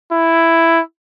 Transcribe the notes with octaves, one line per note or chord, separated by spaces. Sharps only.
E4